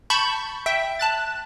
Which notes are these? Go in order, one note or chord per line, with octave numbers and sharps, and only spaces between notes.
A5 B5 C#6 G6
E5 G5
A5 F#6 A6